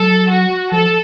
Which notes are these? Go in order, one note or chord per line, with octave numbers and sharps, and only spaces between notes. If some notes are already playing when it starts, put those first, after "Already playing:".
Already playing: F#3 A4
F#4
F3 A4